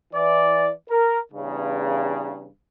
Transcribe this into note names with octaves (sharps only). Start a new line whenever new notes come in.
E3 D5
A#4
E2 G2 C#3